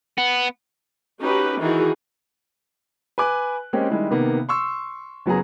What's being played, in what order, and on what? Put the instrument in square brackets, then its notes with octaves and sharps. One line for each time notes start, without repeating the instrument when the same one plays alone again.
[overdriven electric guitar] B3
[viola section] C#4 D#4 F#4 G4 B4
D#3 E3 D#4 F#4 G#4
[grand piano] B4 G#5 D6 F#6
G#3 A#3 C4 C#4 G4
D#3 G3 G#3 E4
C3 D#3 A#3 B3
C6 C#6 E6
F#1 F#3 B3 G#4 A#5